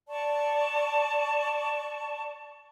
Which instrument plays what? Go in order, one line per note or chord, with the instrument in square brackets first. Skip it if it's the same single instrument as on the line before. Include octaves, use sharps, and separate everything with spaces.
[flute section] D5 A5 C#6